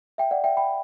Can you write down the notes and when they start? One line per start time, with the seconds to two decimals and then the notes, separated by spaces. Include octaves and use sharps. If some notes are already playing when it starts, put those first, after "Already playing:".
0.18 E5 G5
0.31 D5 F#5
0.44 E5 G5
0.57 G5 B5